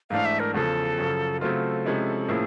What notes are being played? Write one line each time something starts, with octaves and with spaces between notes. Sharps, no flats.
G#2 E3 A3 D4 F5
E5
A#4
E2 C#3 F3 A4
F#2 C#3 F3
C#3 F#3 A3 C4 F4 A4
C3 F3 G#3 C#4 E4
A2 F3 A#3 C#4 E4 G#4